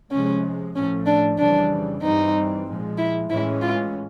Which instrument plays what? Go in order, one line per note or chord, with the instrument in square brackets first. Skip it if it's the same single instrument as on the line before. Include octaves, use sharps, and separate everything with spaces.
[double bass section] C3 F3 G#3 [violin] C#4
[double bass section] A2 F3 A3 [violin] C#4
[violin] D4
[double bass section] F2 C#3 E3 G3 [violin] D4
[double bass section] G2 E3 G3 C4 [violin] D#4
[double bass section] A#2 F3 G#3
[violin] E4
[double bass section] A2 E3 G#3 C#4 [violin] E4
[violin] F4